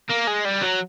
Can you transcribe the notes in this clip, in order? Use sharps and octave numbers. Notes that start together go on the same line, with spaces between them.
A#3
G#3
G3
F#3